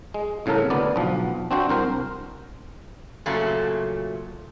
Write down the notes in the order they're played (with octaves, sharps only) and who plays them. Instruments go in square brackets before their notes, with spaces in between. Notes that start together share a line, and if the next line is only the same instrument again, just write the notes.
[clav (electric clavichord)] G#3
C2 A2 C#3 A4 A#4
D2 B3 D5
B1 F3
C4 D4 F#4 C5
C2 A#4 C5
[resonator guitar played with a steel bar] A#2 C#3 F#3 A3